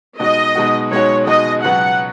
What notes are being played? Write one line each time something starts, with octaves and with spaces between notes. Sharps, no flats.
B2 G#3 D#4 F#4 D#5
B2 G#3 D#4 F#4
B2 G#3 D#4 F#4 C#5
B2 G#3 D#4 F#4 D#5
C#2 B2 F#3 B3 F#4 F#5